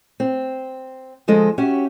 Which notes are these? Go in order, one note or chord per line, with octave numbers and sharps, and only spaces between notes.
C4
D3 F3 G#3 A4 D#5
C#4 F#4 G4 E5